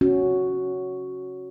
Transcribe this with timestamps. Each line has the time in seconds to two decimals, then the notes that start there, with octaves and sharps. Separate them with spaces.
0.01 C#4 F#4